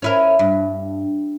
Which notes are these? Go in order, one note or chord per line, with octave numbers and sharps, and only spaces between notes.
C#4 E4 A#4
G2